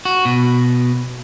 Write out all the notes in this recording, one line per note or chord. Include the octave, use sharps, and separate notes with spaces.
F#4
B2